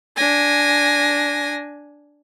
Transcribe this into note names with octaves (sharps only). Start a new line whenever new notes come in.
D4 G#5 A#6